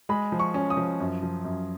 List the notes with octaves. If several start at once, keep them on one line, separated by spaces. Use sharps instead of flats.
G#3 B5
F3
C#6
C#4
D#6
F3
F#2
F3
F#2